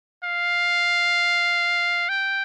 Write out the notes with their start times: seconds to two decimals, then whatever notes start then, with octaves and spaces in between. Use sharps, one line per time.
0.24 F5
2.09 G5